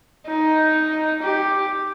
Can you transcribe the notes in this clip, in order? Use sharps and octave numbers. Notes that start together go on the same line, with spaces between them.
D#4
G4